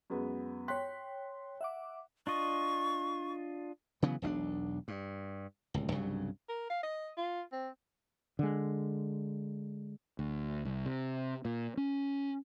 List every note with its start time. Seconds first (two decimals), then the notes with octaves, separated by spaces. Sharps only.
0.10 F#2 G#3 B3
0.68 C#5 G5 C6 F#6 B6
1.61 E5 F#5 D6
2.27 D4 F4 D#5 C#6
4.02 C#3 E3 F#3 B3
4.22 E1 B1 C4 D4
4.88 G2
5.74 D1 C#2
5.92 C2 G2 C#3 F#3
6.49 A#4
6.70 F5
6.83 D#5
7.17 F4
7.52 C4
8.39 D3 G#3
10.19 D2
10.65 C2
10.86 C3
11.45 A#2
11.77 C#4